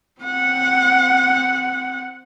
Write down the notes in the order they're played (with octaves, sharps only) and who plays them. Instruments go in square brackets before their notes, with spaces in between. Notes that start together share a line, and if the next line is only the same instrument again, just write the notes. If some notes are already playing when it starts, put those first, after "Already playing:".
[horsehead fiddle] C4 F#5